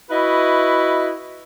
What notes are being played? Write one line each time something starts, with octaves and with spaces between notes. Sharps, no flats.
E4 F#4 B4 D#5 E5